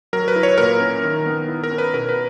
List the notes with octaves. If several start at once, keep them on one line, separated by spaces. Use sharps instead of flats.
F#3 A#4
B4
E4
C#5
A#2 A#4
C#4
D#3
B3
E4
A#4
C#4
B4
B2 A#4
B4